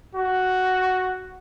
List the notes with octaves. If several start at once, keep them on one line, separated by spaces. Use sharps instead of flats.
F#4